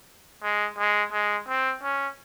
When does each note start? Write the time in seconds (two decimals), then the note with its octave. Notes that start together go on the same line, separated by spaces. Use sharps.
0.43 G#3
0.79 G#3
1.13 G#3
1.48 C4
1.83 C#4